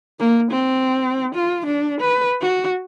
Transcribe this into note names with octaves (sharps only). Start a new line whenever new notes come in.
A#3
C4
F4
D4
B4
F#4